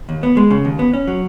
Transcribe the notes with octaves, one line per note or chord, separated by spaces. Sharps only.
D#2
B3
G#3
C#3
D#2
B3
C#4
F#3